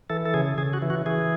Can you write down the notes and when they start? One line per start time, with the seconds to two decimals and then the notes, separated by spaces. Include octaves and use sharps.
0.10 E3 A4
0.25 A4
0.34 C#3 G#4
0.58 C#3 G#4
0.73 F#4
0.82 E3
0.90 F#4
1.06 E3 G#4